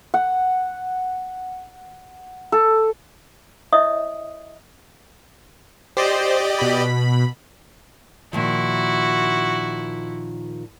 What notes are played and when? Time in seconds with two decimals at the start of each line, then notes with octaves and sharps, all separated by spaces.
0.14 F#5
2.52 A4
3.73 E4 C#5 D#5 E5 D#6
5.97 G4 C5 D5 D#5
6.58 B2 B5
8.33 A#2 D#3 F3 E4 F#4